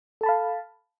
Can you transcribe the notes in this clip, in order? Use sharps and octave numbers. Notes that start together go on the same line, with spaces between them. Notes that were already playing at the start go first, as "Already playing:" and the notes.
A4 F5 A5 B5